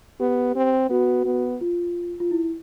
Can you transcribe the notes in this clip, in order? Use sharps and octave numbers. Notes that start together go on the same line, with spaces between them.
B3 G4
C4
B3 F#4
B3
F4
F4
E4